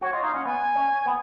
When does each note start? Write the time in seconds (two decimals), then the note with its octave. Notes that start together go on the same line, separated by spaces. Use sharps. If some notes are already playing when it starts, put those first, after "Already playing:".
0.01 F#4 C#5
0.13 F4 D#5
0.23 D#4 F5
0.34 C#4 F#5
0.45 B3 G#5
0.75 C#4
1.06 B3